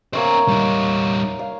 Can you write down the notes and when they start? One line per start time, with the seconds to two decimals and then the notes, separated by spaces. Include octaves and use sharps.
0.13 A#3 C#4 C5 C#5 E5
0.48 G3 D#4
1.39 F5